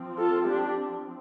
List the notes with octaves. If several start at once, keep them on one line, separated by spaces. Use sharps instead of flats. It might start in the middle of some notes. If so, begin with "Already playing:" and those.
Already playing: F3 C4
F4 A4
D4 G4